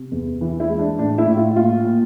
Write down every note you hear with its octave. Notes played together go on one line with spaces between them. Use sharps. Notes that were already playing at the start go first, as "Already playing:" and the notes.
Already playing: C3
E2
E3
E4
G#3
D4
A2 D4
E4
A2
F4
A#2 F4
A#2